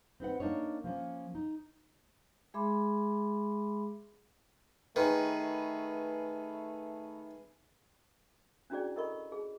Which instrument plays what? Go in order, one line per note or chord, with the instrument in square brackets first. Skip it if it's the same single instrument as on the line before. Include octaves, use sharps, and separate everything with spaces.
[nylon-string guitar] C4 D#4 B4 F#5
A#3 D4 D#4 C#5
F3 A#3 C#4
D#4
[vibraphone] G#3 G#4 E5 B5 C6 D6
[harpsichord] D#3 [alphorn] A3 [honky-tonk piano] G#4 B4
[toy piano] C#4 D4 E4 F#4 G#4 D5
E4 A4 A#4 D#5 B5 C#6
G#4